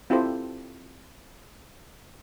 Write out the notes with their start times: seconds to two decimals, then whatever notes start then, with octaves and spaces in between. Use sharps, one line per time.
0.10 C4 E4 F4 G4 A4 C5